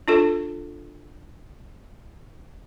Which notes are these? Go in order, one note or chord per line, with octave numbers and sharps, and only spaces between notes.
D4 F4 A4